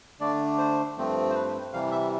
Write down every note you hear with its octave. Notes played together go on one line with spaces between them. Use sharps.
D3 A3 D4 D5
C5
G2 F3 A3 C4
C5
B4
C3 E3 G3 F5
E5